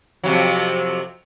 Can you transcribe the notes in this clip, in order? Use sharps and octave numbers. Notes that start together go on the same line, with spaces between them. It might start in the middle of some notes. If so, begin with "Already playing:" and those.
F2 C3 F#3